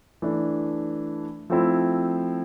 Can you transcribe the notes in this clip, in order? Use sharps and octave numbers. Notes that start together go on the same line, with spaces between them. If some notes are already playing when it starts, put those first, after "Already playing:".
E3 A3 D4
F3 A3 C4 E4